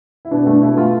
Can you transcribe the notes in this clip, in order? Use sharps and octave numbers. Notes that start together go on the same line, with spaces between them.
E4
B2 D4
A3 D4
B2 E4
A3 F4